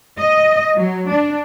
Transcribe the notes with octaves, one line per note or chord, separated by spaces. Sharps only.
D#5
F#3
D4